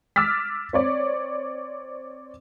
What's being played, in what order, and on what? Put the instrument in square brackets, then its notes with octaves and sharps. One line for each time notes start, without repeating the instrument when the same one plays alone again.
[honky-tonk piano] D6 E6 F6 A6 B6
C4 C#5 D5